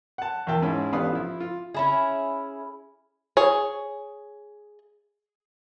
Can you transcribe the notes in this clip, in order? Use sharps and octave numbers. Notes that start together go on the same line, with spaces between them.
F#5 A5
E2 A#4 E5 G5 A5
G#2 C#4 E4 G#4
A1 B3 D4 G4 F5 D#6
F3 E4
F4
C#4 E4 G#4
G#4 C#5